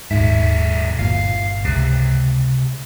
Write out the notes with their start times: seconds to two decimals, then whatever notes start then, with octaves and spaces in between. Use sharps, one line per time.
0.11 D#1 B1 G#2 E5
0.99 G1 A#2 F5
1.65 C#2 C3